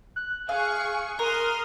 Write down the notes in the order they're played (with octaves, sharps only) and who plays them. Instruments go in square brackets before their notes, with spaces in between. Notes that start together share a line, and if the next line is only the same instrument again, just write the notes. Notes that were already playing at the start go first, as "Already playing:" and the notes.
[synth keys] F#6
[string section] G#4 C#6 [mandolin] F5
[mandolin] A#4 [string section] C6 D#6 F6